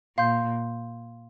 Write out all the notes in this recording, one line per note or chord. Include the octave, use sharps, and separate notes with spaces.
A#2 F5 C6 G6